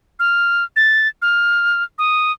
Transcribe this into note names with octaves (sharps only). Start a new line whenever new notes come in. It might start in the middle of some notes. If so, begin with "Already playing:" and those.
F6
A6
F6
D#6